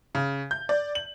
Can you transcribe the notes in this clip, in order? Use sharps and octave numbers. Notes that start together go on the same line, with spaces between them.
C#3
G6
D5
F#7